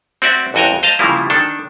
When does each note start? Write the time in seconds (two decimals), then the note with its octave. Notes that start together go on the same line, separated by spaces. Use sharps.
0.22 C4 F#4 D5 E5
0.54 A1 F2 F#4 G5 G#5 A#5
0.83 C5 D#5 F5 A5 A#5
0.99 C#3 F3 G3 A#3 E4
1.30 D#3 D4 A4